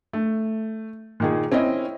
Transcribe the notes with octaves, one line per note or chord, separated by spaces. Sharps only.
A3
A#2 D#3 G#4
C4 C#4 E4 D#5